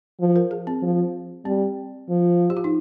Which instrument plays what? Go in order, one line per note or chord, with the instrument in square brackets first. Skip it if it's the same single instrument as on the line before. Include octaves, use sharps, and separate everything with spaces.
[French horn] F3
[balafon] A#4
G#4
C4
[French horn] F3
[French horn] G3 [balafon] C4
[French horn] F3
[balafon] G4
F4
D#4